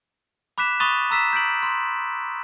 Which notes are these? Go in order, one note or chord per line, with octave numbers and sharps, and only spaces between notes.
B5 D6 F#6 B6 E7
B5 C#6 D#6 F#6 A6 D#7
A#5 E6 B6 E7
G6 B6 D7 F#7
C6